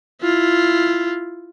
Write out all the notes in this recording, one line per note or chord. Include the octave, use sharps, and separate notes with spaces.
E4 F4